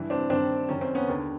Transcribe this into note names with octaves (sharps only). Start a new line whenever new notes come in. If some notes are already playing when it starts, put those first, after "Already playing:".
Already playing: G2 E3
C4 D4
G2 D#3 C4 D4
F#2 D#3 C#4
C4
B3 C#4
D#2 D3